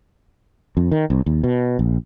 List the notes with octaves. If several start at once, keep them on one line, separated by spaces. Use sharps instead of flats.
F2
D#3
C2
D#2
B2
A#1